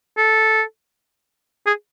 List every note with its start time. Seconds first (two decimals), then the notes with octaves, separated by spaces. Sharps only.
0.17 A4
1.66 G#4